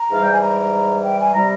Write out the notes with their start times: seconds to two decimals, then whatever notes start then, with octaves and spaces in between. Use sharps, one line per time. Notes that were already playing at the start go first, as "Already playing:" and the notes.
Already playing: A#5
0.10 G#2 E3 G3 F5
0.23 G5
0.32 G#5
0.42 A#5
1.03 G5
1.19 G#5
1.34 C3 G3 A#5